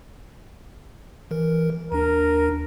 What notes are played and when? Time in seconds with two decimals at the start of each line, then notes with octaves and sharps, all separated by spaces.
1.31 E3 A#4
1.92 D#2 D4 A#4